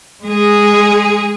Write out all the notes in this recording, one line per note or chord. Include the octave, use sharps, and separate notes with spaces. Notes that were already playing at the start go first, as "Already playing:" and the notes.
G#3 G#4